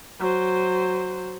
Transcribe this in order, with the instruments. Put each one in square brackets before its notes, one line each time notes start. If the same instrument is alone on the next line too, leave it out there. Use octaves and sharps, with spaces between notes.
[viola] F#3 C5